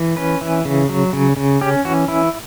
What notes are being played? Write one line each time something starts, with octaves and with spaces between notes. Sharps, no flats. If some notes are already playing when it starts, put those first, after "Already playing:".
Already playing: E3
C#4 B4
E3
C#3
F#3
C#3
C#3
C#4 G4
E3 F#4
E3 E4